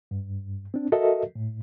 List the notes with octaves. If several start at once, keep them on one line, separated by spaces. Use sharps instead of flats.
G2
C4 D4
F#4 A4 A#4 D#5 E5
A2